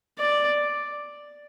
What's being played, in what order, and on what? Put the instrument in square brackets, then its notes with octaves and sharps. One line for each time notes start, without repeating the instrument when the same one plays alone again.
[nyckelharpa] D5